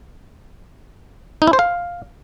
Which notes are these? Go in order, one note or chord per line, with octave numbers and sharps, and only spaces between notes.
D#4
E4
C5
F5